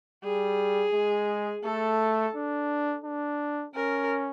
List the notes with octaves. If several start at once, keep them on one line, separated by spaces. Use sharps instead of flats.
G3 G#4
G#3
A3 A4
D4
D4
C#4 A#4